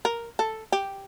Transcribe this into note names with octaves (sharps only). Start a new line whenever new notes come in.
A#4
A4
G4